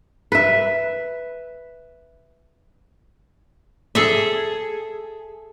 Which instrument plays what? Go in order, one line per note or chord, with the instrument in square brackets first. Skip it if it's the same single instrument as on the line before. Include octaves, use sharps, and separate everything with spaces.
[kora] B4 E5
[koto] G#4 A4 E5